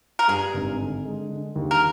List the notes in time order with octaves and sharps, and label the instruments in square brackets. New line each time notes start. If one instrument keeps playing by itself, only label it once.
[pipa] A#4
[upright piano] G2 [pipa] G#4
[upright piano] G#1
D3
G#3
D3
D#2
[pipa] A#4